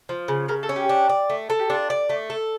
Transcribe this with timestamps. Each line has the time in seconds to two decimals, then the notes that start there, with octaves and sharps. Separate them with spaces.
0.09 F3
0.28 C#3
0.48 C#3 A#4
0.63 A4
0.69 C#4
0.76 G4
0.89 D4
1.09 D5
1.30 A3
1.50 A4
1.59 G4
1.70 D4 F4
1.90 D5
2.09 A3
2.30 A4